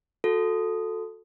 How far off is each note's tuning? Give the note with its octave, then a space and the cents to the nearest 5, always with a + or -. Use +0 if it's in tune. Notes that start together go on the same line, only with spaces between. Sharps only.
F#4 -30 A4 +0